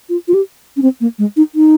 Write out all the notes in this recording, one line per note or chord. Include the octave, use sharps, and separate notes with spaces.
F4
F4
G4
C#4
C4
A#3
G#3
D#4
D#4